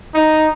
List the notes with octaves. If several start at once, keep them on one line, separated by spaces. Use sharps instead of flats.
D#4